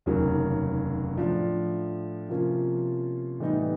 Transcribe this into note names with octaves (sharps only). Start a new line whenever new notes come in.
F1 D#2 C#3 F#3 A#3
A2 F3 A3 D4
C3 F3 A#3 C#4 F4
A2 E3 G3 B3 D#4